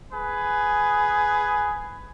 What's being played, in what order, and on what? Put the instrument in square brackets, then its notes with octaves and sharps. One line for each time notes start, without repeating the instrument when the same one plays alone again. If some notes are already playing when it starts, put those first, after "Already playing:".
[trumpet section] G#4 B4